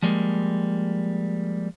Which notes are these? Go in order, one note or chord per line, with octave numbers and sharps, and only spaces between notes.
F3 G3 G#3 A#3